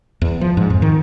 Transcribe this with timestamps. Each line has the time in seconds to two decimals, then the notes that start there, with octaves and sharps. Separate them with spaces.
0.22 E2
0.41 F3
0.57 G#2
0.70 F2
0.82 D#3